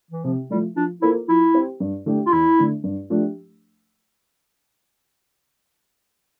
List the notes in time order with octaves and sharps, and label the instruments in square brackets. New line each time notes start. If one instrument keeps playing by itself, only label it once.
[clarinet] E3
[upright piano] C3 [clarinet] F3
[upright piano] F3 A3 [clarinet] G3
[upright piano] F3 [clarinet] D4
[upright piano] A#3 F4 A4 C5 [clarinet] E4
[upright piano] F3 [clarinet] E4
[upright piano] C4 G4 C5
G2
D3 A3 D4 G4
[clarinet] F4
[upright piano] E2 [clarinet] E4
[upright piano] D3 A3 D4
G2
F3 A3 D4 G4